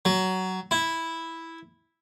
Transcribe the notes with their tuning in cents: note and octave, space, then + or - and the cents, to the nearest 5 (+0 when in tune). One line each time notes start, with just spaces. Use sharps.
F#3 +15
E4 -5